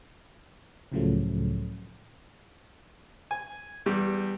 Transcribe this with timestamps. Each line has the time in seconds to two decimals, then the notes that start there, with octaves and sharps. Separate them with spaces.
0.92 C#2 A2 C#3 F3 F#3 A3
3.31 G#5
3.86 E2 G3